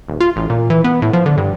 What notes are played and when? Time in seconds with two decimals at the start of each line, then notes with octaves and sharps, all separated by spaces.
0.08 D#1
0.20 F4
0.36 A1
0.50 A#2
0.70 E3
0.84 B3
1.02 A2
1.13 F3
1.26 D3
1.37 G2